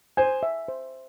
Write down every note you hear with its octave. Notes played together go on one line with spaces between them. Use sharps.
C5 G#5
E5
C5